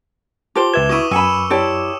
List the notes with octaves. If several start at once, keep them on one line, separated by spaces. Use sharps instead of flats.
F4 G4 C5 A5 D6 G7
C#2 B4 E5 G#6 A6 E7
E4 F#4 C#6 D#6 D#7
F#2 G#5 B5 E6 C#7 E7
E4 G4 C#5 D5 A5 C6 E6 C#7